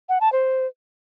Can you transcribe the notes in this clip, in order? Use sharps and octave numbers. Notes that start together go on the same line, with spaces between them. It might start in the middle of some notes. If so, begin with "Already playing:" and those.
F#5
A5
C5